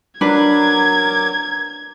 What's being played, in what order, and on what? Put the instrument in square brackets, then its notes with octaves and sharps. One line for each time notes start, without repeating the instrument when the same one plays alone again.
[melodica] F#3 A#4 D6 [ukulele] D4 B4 [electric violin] G#6